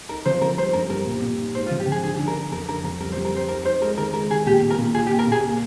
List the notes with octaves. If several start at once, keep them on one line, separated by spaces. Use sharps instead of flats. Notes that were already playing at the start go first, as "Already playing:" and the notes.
D#4 A#4
F3 C5
F3 A#4
G3 C5
G2 A#4
G3 A#4
A#2
A#2
D#4
G#2 C5
F4
F3
G4
F3 G#4
D3 G#4
D4
A#4
D4
F2 A#4
D4 A#4
F2 A#4
G3 A#4
C5
G3
A#4
C4 C5
D#4 A#4
D#4 C5
G#3 A#4
D#3 A#4
G#3 A#4
D#3 G#4
A#2 G4
A#2
A#4
A#2
F4 G#4
G4
A#3
A#4
A#2 G#4
A#3